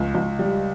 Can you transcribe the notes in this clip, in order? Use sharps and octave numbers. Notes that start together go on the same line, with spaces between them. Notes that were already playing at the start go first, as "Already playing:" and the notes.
Already playing: C#2
C#2
G3